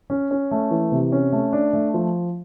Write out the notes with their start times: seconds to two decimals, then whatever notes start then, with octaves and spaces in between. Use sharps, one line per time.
0.10 C#4
0.31 C#4
0.51 A3
0.71 E3
0.92 C3
1.12 C#4
1.32 A3
1.53 D4
1.73 A3
1.94 F3